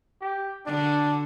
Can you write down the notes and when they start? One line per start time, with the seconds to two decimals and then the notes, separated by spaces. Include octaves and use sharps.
0.21 G4
0.66 D3 D4 F#4